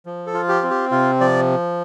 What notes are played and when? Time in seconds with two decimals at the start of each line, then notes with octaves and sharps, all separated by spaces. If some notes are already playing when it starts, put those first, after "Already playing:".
0.06 F3
0.26 A4
0.34 F4
0.48 G4
0.63 C4
0.70 G4
0.91 C3 F4
1.21 F3 D5